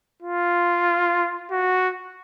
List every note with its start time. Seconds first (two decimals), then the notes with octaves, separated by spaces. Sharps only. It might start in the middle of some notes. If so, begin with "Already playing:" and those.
0.23 F4
1.52 F#4